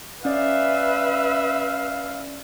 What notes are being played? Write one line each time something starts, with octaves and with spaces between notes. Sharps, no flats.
C#4 B4 D5 E5 F5